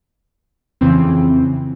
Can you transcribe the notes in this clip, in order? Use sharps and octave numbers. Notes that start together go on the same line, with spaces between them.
F2 C#3 E3 C4